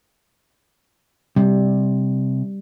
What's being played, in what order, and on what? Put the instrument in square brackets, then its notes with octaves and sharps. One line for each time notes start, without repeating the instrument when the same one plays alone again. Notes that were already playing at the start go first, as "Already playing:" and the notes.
[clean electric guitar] C3 [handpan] G3